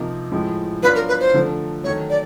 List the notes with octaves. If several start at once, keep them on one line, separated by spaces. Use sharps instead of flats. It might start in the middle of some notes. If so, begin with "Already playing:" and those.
Already playing: C3 F3 A#3 D#4
A2 F3 G#3
F#3 B3 D4 F4 B4
A#4
B4
C5
D3 F3 A3
D#3 F#3 A3 C#5
D5